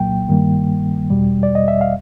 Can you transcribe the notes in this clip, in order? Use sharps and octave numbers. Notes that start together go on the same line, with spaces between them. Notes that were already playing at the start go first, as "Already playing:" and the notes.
Already playing: C2 A#2 F#3 A#3 G5
G2 D#3 G3 A#3
E2 B2 G3
D5
D#5
E5
F5